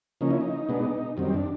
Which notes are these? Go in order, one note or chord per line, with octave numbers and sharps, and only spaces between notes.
C#3 F3 A#3 C#4 D#4
E4
D#4
B2 G#3 B3 D4
F#2 D#3 G3 C4
D4